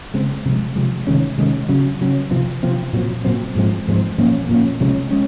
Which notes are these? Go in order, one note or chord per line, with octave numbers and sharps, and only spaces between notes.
C#3 G#3 C4
C3 F3 G#3
C3 F3 G#3
C3 D#3 G#3 C#4
C3 D#3 G#3 C#4
C#3 F#3 C#4
C#3 F#3 C#4
C3 F3 C4
C3 F3 C4
A#2 F#3 C4
A#2 F#3 C4
G#2 F3 G#3 C4
G#2 F3 G#3 C4
A#2 F3 A#3 C#4
A#2 F3 A#3 C#4
C3 F3 G#3 C#4
G#3 C#4